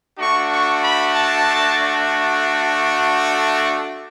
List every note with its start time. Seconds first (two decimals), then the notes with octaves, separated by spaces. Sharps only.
0.17 A3 D4 F#4 C#6
0.49 C#6
0.81 B5
1.12 A5